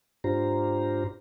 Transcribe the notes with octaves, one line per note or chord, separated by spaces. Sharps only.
G#2 D4 F4 G4 C5 A#5